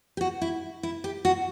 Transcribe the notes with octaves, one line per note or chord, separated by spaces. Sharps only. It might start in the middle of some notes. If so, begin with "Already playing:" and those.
G4
F#4
E4
E4
G4
F#4